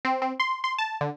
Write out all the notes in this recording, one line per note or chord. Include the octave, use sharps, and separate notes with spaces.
C4
C4
C6
C6
A5
D3